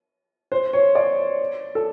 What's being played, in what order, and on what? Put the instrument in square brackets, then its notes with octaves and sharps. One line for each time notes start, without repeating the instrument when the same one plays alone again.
[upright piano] C5
C#5
D5
A4